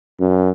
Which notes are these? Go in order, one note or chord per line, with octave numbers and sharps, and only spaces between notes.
F#2